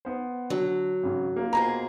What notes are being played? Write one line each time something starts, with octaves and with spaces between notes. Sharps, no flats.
B3 C5
D3 F#3
G#1 C#3
A#3 F4
B2 G#4 C5 A#5